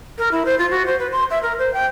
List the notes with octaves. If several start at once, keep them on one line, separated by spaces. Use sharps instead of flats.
A#4
E4
C5
F4
F#4
C5
B4
C6
E5
A#4
C5
G5